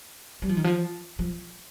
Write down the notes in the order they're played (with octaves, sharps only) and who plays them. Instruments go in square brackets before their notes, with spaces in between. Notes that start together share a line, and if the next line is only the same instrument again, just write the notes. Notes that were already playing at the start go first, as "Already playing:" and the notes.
[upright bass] G3
F3
D#3
F3
F3